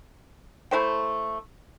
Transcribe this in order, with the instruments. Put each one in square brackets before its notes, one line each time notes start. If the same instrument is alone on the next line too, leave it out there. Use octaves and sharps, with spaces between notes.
[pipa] A3 E4 C5 G5